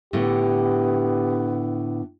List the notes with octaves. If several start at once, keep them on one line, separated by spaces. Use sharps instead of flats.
A2 D3 A3 B3 G4